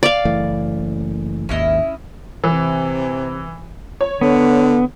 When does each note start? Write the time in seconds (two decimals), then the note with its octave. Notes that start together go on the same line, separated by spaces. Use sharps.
0.03 D5 F5
0.25 F#1 E3 A3
1.49 G#1 D#2 C#4 E4 D#5
2.44 C3 E3
4.01 C#5
4.21 D3 B3